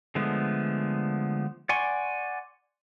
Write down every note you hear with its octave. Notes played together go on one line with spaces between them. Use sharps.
D3 F3 G#3 A3 B3
D5 F#5 G#5 C6 C#6